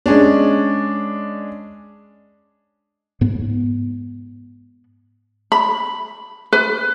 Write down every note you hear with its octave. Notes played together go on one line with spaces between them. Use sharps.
G#3 C#4 D4
G#2 B3
B5
B4